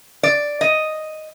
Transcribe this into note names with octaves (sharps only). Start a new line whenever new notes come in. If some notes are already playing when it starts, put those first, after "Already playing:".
D5
D#5